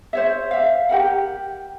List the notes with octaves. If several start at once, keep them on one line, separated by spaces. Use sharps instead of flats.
C5 C#5 E5
E5 F5
G4 A#4 F#5